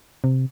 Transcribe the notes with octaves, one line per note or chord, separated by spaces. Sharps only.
C3